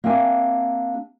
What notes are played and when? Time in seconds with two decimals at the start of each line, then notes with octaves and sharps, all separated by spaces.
0.04 A#3 C4 D4 G4 E5 G#5